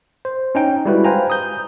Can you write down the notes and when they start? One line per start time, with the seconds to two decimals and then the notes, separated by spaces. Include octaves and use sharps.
0.25 C5
0.55 C#4 D#4 G5
0.85 G3 G#3 E4 F#4 B4
1.04 B4 C5 F5 G5 G#5 A#5
1.30 D#6 G6